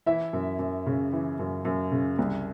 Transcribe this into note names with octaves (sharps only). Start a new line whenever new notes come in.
E3 E4 E5
F#2
F#2
C#3
E3
F#2
F#2
C#3
C2